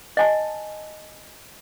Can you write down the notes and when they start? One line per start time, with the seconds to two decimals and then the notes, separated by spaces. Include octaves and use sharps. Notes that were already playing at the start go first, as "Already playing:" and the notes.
0.17 D#5 G#5 A5